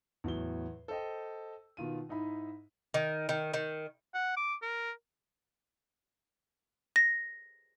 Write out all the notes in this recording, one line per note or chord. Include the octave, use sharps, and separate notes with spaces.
E2 A2 F#3 G7
A4 C5 D#5 G5
B2 D#3 F4 D#7
G#2 D#4 E4 B5
D#3
D#3
D#3
F#5
D6
A#4
A#6